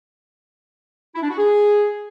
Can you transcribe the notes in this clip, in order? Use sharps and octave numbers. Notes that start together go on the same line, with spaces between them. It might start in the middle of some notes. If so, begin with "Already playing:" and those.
E4
D4
F#4
G#4